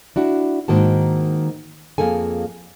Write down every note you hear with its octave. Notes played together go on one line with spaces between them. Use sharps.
D4 E4 F#4
G#2 D#3 A#3 F#4 A5
F2 A#3 G#4 A4 G#5